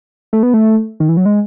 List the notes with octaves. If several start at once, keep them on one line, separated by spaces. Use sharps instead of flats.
A3
B3
A3
D#3
E3
F#3
G#3